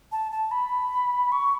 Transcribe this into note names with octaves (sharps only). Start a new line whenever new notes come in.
A5
A5
B5
C#6